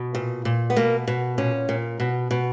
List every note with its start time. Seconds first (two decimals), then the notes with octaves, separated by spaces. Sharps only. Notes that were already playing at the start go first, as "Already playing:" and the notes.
Already playing: B2
0.15 A#2
0.45 A#2
0.70 B3
0.76 B2 A#3
1.07 B2
1.38 A#2 C#4
1.69 A#2
2.00 B2
2.31 B2